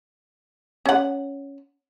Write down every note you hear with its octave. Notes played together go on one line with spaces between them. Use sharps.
C#4 F#5